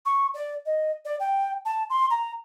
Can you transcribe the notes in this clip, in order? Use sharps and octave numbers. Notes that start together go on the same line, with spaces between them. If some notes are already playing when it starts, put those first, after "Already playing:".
C#6
D5
D#5
D5
G5
A5
C6
A#5